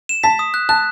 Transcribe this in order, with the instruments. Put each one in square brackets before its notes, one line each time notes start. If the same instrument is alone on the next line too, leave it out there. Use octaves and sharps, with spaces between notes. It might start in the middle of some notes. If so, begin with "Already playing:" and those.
[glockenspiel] E7
[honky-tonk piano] A5 [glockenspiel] B6
[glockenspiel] D#6
F#6
[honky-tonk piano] A5 [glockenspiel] F#6